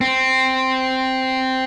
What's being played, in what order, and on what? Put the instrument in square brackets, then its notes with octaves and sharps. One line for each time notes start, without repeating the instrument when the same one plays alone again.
[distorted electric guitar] C4